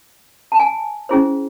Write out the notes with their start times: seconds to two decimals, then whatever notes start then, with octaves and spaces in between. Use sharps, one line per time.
0.52 A5
0.59 G#5
1.09 C#4 E4 G#4 C5